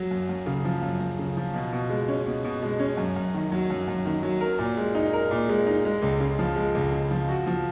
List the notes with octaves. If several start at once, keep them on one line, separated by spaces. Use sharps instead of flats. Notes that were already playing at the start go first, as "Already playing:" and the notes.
Already playing: F#3
F#2
F#2
C#3
F3
F#2
F#2
C#3
F3
B2
B2
G#3
C#4
B2
B2
G#3
C#4
F#2
F#2
D#3
F#3
F#2
F#2
D#3
F#3
A#4
A#2
G#3
D#4
A#4
A#2
G#3
D#4
G#3
C#2
C#3
F3
G#3
C#2
C#3
F3
F#4
F3